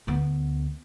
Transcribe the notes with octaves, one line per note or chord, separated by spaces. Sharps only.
D2 B3